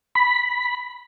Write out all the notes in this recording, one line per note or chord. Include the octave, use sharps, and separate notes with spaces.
B5